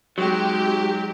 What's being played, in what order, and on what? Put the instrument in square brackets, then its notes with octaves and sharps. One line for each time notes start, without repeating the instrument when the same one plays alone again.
[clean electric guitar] F#3 [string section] G#3 G4 [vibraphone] C4 D#4 F#4